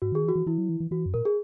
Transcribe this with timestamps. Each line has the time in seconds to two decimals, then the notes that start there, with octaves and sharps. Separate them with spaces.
0.02 G#2 F#4
0.12 D#3 G#4
0.24 E3
0.29 F#4
0.35 E3
0.46 E3 E4
0.58 F#3
0.69 E3
0.80 E3
0.91 E3 F#4
1.06 F#2
1.14 A#2 A#4
1.25 G#4